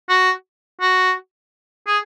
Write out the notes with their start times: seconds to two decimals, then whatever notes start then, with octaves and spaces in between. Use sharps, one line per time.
0.09 F#4
0.80 F#4
1.87 G#4